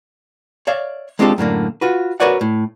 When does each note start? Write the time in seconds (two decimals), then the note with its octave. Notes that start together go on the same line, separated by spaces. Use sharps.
0.67 C#5 D5 E5 F5
1.19 G#3 C4 D4 F4 G4 A4
1.38 F#2 A2 D3 A#3
1.81 F4 F#4 B4
2.20 F#4 A#4 B4 C#5 D5 F#5
2.41 A2